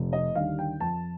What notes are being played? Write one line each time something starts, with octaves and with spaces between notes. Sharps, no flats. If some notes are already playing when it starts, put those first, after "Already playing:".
Already playing: F1
D#5
D#2 D3 G3 F5
G5
F2 A5